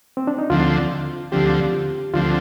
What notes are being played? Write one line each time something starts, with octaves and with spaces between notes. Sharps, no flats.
C4
D4
D#4
D2 D3 F3 C4 F4
D2 D3 F3 C4 G4
D2 D3 F3 C4 F4